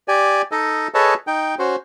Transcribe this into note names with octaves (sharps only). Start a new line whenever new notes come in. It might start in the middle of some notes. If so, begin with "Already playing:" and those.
G4 D5 G#5
D#4 A4 D#5
G#4 A4 B4 C#5 D#5 A5
D#4 G5
C#4 F#4 C5